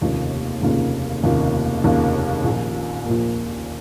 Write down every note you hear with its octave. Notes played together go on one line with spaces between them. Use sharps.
F1 D#2 C#3 A#3 F4
F1 D#2 C#3 A#3 F4
F1 D#2 C#3 A#3 F4
F1 D#2 C#3 A#3 F4
A#1 A#2 A#3
A#1 A#2 A#3